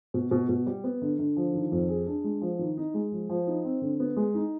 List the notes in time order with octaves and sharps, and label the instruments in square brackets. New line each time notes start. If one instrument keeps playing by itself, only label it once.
[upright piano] B2
B2
B2
G3
B3
D3
D3
F3
D#3
F2
G#4
D4
G#3
F3
D#3
D#4
G#3
F3
F3
D#4
C4
D3
B3
G#3
D#4